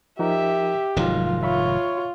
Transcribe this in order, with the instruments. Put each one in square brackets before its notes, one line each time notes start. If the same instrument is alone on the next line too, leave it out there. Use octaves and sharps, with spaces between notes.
[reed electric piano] F3 D#4 A#4 [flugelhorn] G4 [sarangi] E5
[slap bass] F1 G#2 D#3 [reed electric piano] F#3 D#4 [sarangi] F4
[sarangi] F4 [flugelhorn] C#5 [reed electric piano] E5 B5 C#6